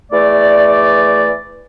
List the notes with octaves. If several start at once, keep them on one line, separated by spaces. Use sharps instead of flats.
E2 E3 A3 D5